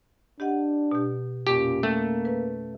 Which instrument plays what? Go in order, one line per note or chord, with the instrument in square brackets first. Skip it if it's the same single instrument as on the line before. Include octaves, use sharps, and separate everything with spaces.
[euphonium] D4 [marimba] G4 D#5 F#5
[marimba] B2 G4
[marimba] F2 C#4 [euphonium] A#2 [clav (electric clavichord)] G4
[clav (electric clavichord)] A3 [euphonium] A#3
[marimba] B4